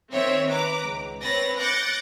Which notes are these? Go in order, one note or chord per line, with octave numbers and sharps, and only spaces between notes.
D#3 C4 C#5 E5
B4 A#5 D6
C#2
C4 B4 C#5 A6 A#6
D6 F#6 G6 A6 A#6 C#7